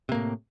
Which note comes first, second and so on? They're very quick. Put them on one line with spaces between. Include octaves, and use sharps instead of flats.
C3 A#3 A2